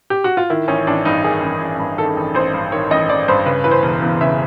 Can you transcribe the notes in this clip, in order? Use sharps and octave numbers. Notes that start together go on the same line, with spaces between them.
G4
F#4
F4
D#3 E4
A1 C#4
A1 D4
G2 D#4
D#3 G#4
A1
A1
G2
D#3 A4
A1
A1 C5
G2
D#3 C#5
A1 D#5
A1 D5
G2 C5
C#3 B4
E3 B4
C5
E1
E2
C#3 E5